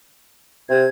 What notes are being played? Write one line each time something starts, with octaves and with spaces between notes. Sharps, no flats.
C3 G#6